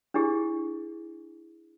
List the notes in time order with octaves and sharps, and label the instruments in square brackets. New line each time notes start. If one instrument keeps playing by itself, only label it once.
[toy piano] D4 E4 G4 G#4